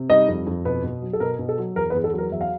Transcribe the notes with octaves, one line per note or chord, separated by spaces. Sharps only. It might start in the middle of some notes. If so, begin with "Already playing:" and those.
Already playing: C3
G3 D#4 D#5
F2
F2
B2 B3 B4
B2
F#3
A4
B2 A#4
B2
A4
F#3
E2 A#4
B3 B4
E2
A4
F#3
A#4
E2 E5
F5